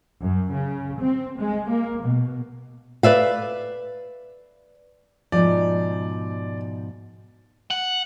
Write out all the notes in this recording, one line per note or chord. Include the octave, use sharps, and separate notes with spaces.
F#2
C#3
C4
G#3
A#3
B2
B4 D5 E5 F5
G#2 B2 F3 D5
F#5